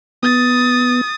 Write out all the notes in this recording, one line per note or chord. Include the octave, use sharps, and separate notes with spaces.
B3 D#6 A6